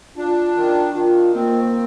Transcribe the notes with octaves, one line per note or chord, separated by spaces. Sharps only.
D4 F4
D#3
D#3 F4
A#3 C4